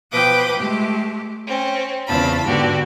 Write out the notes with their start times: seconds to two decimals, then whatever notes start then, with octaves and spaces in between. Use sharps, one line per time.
0.12 B2 F3 B4 G5 D6 D#6
0.59 G#3 A3 G4
1.46 C4 C#4
2.08 E2 C#3 C4 F4 A5 B5
2.45 G#2 D3 B3 F#4 G4